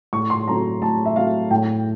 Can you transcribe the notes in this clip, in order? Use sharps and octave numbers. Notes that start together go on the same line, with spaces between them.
A2 C#6
C6
F#3 A3 C4 A#5
A2 A5
E5
F#3 A3 C4 F5
A2 G5